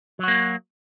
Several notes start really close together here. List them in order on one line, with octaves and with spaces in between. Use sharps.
F#3 F#4 A#3